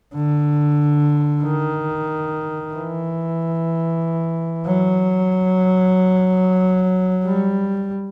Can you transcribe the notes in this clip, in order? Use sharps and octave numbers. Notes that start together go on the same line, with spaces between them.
D3
D#3
E3
F#3
G3